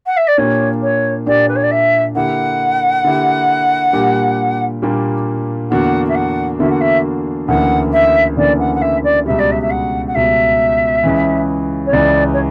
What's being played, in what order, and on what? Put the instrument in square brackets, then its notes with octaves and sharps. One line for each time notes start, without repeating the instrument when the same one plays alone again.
[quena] F#5
E5
D5
[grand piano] A#2 A#3 D4 G4 [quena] C#5
[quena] C#5
[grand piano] A#2 A#3 D4 G4 [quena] D5
[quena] B4
C#5
D5
E5
[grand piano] D3 A#3 E4 G4 [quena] F#5
[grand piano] D3 A#3 E4 G4
A#2 G3 A#3 D4 G4
A#2 G3 A#3 D4 G4
[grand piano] E2 D3 A#3 D4 F#4 [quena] F#5
[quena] E5
F#5
[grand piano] E2 D3 A#3 D4 F#4 [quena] E5
[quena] F#5
E5
[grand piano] D2 C#3 E3 A#3 D4 [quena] F#5
[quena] E5
[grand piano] D2 C#3 E3 A#3 D4 [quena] D5
[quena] F#5
F#5
E5
D5
[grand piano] C#2 B2 G3 [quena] E5
[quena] D5
E5
E5
F#5
F#5
[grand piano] C#2 B2 G3 [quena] E5
[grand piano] C#2 C#3 E3
[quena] C#5
[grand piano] C#2 C#3 E3 [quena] D5
[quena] C#5